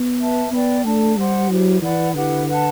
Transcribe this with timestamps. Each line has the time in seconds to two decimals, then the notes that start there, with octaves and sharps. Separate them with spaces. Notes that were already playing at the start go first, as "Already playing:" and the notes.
Already playing: B3
0.20 B4 E5 A5
0.52 B3 B4 D5 G5 B5
0.84 A3 D4 A4 D5 A5
1.17 G3 G4 C5 F#5 C6
1.49 F#3 E4 G4 C5
1.82 E3 B4 D5 F#5 B5
2.15 D3 E4 G4 B4 F#5
2.47 B4 F#5 A5